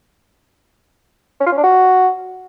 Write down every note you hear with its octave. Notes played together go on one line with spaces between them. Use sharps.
C#4
F4
C#4
D4
F#4